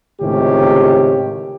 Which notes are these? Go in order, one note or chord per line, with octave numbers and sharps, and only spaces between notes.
C#2 A2 C3 D#3 C#4 G4